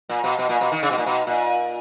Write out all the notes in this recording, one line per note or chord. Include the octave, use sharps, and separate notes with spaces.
A#2
B2
B2
A#2
B2
D#3
C#3
B2
A#2
B2
A#2